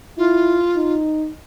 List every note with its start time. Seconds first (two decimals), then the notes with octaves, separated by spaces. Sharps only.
0.18 E4 F4
0.76 D#4